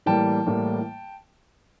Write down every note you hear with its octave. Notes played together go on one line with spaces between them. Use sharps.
A2 E3 G3 A#3 G5 A5
A2 E3 G3 A#3